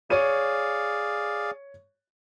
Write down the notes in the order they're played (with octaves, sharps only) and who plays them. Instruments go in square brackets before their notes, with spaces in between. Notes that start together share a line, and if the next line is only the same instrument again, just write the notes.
[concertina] G#4 D5 F5 [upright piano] C#5 D#7